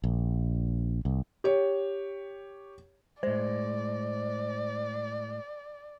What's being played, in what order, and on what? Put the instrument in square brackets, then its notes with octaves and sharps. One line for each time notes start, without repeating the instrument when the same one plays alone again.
[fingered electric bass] A#1
C2
[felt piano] G4 C#5
[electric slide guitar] A2 G#3 [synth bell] C5 [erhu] D5